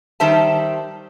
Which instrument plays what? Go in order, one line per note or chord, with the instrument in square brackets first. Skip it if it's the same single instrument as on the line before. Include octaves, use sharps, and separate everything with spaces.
[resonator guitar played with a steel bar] D#3 G3 C5 E5 A5